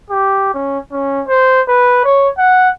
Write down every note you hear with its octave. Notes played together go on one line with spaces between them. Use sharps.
G4
C#4
C#4
C5
B4
C#5
F#5